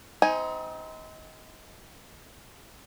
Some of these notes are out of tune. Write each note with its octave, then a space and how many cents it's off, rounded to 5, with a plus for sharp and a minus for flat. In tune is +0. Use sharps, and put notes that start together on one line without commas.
C4 -25 D#4 +25 G#5 +0